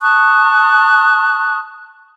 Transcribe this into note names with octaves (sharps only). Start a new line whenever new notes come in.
A5 C#6 D#6 F#6